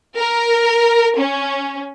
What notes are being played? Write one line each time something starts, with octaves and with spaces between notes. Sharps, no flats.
A#4
C#4